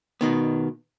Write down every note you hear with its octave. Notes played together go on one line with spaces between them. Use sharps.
B2 D#3 B3